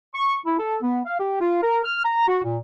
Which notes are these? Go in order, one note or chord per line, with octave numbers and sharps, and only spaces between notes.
C#6
E4
A4
B3
F5
G4
F4
A#4
F6
A#5
F#4
A#2